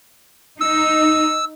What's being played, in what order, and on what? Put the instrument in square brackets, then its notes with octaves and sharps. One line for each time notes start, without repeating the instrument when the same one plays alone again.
[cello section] D#4 [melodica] E6